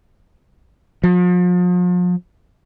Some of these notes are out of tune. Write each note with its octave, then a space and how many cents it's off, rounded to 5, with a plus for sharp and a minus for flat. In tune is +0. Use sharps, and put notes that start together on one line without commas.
F3 +40